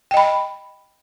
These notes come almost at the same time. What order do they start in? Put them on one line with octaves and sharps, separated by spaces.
G5 D#5 B5